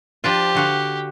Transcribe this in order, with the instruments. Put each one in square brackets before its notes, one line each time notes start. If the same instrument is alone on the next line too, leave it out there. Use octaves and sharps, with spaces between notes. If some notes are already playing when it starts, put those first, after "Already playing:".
[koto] F3 D4 F4 [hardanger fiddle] G4
[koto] D3 F#4 F5